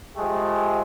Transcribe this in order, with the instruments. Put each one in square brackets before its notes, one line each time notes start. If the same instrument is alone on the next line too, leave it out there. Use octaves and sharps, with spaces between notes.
[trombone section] F3 G#3 A3 G4 G#4